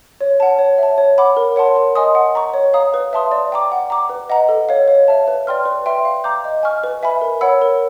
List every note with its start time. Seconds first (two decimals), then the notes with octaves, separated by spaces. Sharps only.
0.21 C#5
0.40 F#5 A5
0.59 C#5
0.78 E5 A5
0.98 C#5
1.18 F#5 B5 D6
1.37 A#4
1.56 C#5 F#5 A5 C6
1.76 A#4
1.95 D#5 G#5 C6 D#6
2.15 F#5
2.35 A#5 C#6
2.54 C#5
2.74 F5 A#5 D#6
2.94 B4
3.13 E5 A5 C6 D#6
3.32 D5
3.52 G5 A#5 D6
3.72 F#5
3.90 A#5 D6
4.10 B4
4.30 D#5 F#5 A#5
4.49 A4
4.69 C#5 F5
4.88 C#5
5.08 E5 A5
5.28 B4
5.47 D5 G5 C6 F6
5.65 B4
5.86 E5 G5 C6
6.05 F5
6.24 A#5 D6 G6
6.44 D#5
6.63 G#5 C#6 F6
6.84 B4
7.03 E5 G#5 B5
7.21 A#4
7.41 C#5 F#5 B5 E6
7.62 A#4